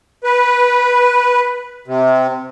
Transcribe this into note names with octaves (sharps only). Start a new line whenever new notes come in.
B4
C3